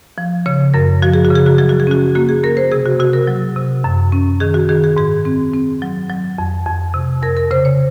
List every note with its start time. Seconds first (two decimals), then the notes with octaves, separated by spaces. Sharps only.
0.18 F3
0.46 C#3 C#5
0.74 F#2 A#4
1.02 F3 F#4
1.14 G#4
1.25 F#4
1.31 C#3 G#4
1.46 F#4
1.58 F#3 G#4
1.69 F#4
1.80 G#4
1.87 C#4 F#4
2.15 A#3 F#4
2.29 G#4
2.43 A#3 A#4
2.57 C5
2.72 C3 G#4
2.86 F#4
3.00 C3 F#4
3.13 A#4
3.27 F#3
3.56 C3
3.84 F#2
4.12 C#4
4.40 D#3 G#4
4.54 F#4
4.69 D#3 G#4
4.84 G#4
4.97 G#2 G#4
5.25 C4
5.53 C4
5.82 F#3
6.10 F#3
6.38 F2
6.66 F2
6.94 C3
7.22 F2 A#4
7.37 A#4
7.51 C#3 C5
7.65 C#5